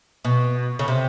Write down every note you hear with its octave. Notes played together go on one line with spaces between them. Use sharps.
B2
C#3
C3